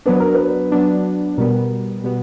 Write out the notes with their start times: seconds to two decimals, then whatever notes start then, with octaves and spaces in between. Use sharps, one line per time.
0.06 F#3 B3 D4 B4
0.20 A#4
0.34 B4
0.72 F#3 B3 D4
1.38 B2 G3 B3 A#4
2.04 B2 G3 B3